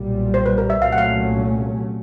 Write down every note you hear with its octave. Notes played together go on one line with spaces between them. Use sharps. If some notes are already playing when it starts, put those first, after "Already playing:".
Already playing: B1 A#2 G3
C5
B4
A#4
E5
C2 A#2 F#3 A3 C#4 F5
F#5
F5